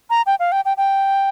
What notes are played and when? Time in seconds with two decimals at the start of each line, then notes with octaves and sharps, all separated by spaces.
0.10 A#5
0.26 G5
0.40 F5
0.52 G5
0.65 G5
0.77 G5